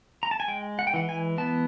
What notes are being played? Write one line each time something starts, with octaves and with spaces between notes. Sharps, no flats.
A#5
A5
G#5
G#3 G5
F#5
G5
E3 F#5
G#5
B3 A5